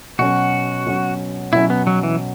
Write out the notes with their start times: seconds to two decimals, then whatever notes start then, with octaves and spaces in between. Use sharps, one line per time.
0.19 B2 F#3 C#4 F#4
0.86 B2 F#3 C#4
1.53 B2 F#3 C#4 E4
1.70 B3
1.87 F#3
2.03 E3